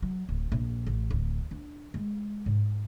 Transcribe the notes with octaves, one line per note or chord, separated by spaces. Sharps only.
F#3
D1
A#1
A1
D1
D4
G#3
G#2